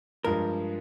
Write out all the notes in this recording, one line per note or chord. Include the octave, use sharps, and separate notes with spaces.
G2 F3 G#3 A#4